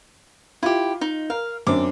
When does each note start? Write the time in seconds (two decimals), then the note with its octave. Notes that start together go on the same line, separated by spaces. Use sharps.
0.63 E4 F4 G4
1.01 D#4
1.30 A#4 F5
1.67 F#2 C4 D4 D6